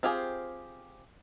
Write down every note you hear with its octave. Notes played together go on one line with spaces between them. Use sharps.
C4 F4 G4 G#4 C5